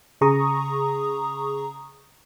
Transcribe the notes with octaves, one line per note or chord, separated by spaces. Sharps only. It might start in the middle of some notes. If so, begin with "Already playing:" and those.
C#3 G#4 A#5 C#6 D#6